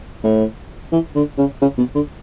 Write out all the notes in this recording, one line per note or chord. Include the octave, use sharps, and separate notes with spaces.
A2
E3
D3
C#3
C#3
B2
D3